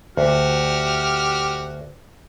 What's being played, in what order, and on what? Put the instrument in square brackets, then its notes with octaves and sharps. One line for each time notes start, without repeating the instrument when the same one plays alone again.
[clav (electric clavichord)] D2 [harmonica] F#4 G4 F6